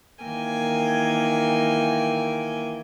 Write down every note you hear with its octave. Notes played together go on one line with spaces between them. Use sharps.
D#3 E3 A#3 G5 G#5